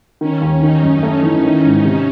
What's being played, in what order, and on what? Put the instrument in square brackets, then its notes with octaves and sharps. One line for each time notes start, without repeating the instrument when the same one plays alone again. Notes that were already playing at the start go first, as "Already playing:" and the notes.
[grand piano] D#3 [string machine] C#4
[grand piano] D#2
[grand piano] D#3 [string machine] D#4
[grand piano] F#2
A3
E3
D#3
G#2
C3